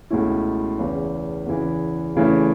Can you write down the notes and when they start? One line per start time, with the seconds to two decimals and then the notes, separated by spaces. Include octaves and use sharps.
0.10 C#2 B2 A3 C#4 E4
0.79 E2 C#3 E3 B3
1.46 E2 C#3 E3
2.15 E2 C#3 E3 A3